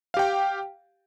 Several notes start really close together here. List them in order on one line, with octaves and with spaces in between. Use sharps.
F5 G4 G5